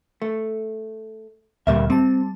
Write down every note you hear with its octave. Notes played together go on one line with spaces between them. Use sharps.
A3
D2 A#2 G3 A#3 E5
G3 C4 A5